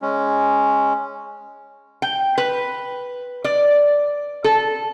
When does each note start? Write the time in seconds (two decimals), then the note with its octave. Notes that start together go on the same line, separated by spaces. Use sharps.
0.02 G#3 C#4
2.02 G5
2.38 B4
3.44 D5
4.44 A4